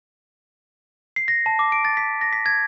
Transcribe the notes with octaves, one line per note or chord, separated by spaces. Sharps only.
C7
A#6
A5
D6
D7
A6
B6
A#6
B6
G#6